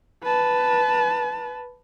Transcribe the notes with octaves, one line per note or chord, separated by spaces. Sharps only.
B4 A5